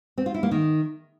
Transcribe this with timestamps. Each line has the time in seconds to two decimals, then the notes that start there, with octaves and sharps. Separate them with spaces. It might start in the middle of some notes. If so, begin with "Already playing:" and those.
0.18 C4
0.26 F4
0.34 E4
0.43 A#3
0.51 D#3